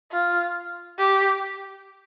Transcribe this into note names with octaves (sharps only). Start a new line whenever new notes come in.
F4
G4